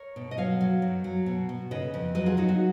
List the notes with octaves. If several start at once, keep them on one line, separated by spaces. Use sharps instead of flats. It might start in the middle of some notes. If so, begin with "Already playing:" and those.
Already playing: A#4 C#5
B2
D#5
F#3 C#5 F5
F#3
F#2
F#3
B2
B2
C#3 B4 D#5
F2
F#3 B4 D#5
F4 G#4
F#3 D#4 F#4
D#4 F#4